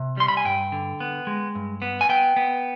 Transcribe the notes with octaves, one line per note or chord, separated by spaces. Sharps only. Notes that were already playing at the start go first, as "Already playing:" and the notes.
Already playing: C3
G3 C6
B5
G#5
G2 G5
D3
B3
G#3
G2
B3
G#5
B3 G5
B3